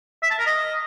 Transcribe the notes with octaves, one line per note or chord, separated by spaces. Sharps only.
E5
A5
A#4
D#5